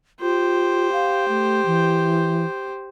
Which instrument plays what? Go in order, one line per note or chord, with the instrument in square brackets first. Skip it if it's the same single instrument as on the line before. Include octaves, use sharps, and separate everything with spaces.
[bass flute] F4 [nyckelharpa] G4 C5
[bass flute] F5
A3
E3